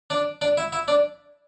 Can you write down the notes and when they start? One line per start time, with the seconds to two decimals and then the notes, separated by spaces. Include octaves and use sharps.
0.10 D4 D5
0.41 D4 D5
0.57 E4 E5
0.72 E4 E5
0.88 D4 D5